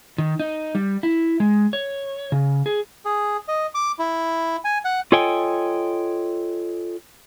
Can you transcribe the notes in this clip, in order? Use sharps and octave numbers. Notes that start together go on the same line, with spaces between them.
D#3
D#4
G3
E4
G#3
C#5
C#3
G#4
G#4
D#5
D6
E4
G#5
F#5
F4 A4 C#5 D#5 G5 G#5